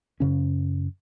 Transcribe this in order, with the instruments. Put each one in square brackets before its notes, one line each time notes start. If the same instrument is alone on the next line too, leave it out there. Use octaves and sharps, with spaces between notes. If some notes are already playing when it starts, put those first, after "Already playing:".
[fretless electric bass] F#2 C#3 C#4